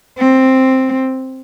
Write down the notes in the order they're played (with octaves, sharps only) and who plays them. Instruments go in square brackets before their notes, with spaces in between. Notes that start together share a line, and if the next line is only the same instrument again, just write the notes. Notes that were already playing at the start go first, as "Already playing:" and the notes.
[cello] C4